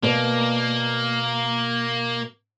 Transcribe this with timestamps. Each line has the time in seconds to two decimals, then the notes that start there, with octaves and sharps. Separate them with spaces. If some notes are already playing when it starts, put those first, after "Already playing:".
0.03 B2 A#3 B4 D5